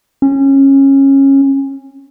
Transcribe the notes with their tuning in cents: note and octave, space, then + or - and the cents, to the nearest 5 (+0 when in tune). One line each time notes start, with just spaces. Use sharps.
C#4 -20